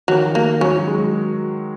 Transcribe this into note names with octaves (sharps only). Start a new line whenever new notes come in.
D#3 F#3
A#3
F#3 C#4
F#3
G#3